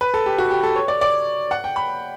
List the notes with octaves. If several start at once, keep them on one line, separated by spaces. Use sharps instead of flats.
B4
A4
G4
F#4
G4
A4
C#5
D5
D5
F#5
G5
B5